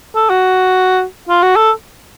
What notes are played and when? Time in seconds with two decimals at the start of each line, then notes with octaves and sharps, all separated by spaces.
0.15 A4
0.30 F#4
1.29 F4
1.43 F#4
1.56 A4